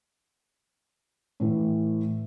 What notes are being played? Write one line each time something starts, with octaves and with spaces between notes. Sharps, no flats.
A2 E3